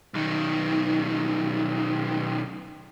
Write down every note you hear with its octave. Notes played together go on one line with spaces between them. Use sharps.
B1 D#3